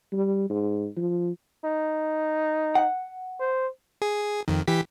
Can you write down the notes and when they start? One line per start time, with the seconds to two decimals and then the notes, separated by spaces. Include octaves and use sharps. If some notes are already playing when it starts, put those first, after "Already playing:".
0.12 G3
0.50 G#2
0.97 F3
1.65 D#4
2.75 F#5
3.40 C5
4.02 G#4
4.48 F2 D#3
4.67 E3 G4 B6